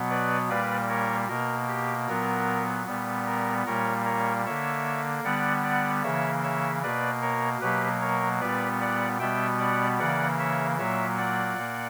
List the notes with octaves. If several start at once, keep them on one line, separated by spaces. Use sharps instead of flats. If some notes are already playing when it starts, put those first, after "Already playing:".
Already playing: B2 F#3 B3
B4 D5
A#2 G3 A#3 B4 D5
A#4 C#5
B2 A#3 A#4
G4
A#2 F#3 B3 A#4
A#2 G3 B3
A#4
A#2 G3 A#3 A#4 C#5
A#4 C#5
D3 A#3 C#5 E5
D3 G3 B3 D5 F#5
D5 F#5
C#3 E3 A#3 C#5 E5
C#5 E5
B2 A#3 B4 D5
A#4 C#5
B2 F#3 A#3 G4 B4
A#4 C#5
A#2 G3 B3 B4 D5
D5 F#5
B2 G3 B3 E5 G5
D5 F#5
C#3 E3 A#3 D5 F#5
C#5 E5
A#2 F#3 A#3 C#5 E5
D5 F#5
A#2 A#3